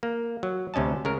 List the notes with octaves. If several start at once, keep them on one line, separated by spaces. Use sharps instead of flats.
A#3
F#3
D2 C3 C#4 D#5 A5
C#3 G#3 A#4